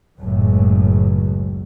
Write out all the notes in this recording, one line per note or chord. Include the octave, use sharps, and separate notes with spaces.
F#1 C#2 A2 F#3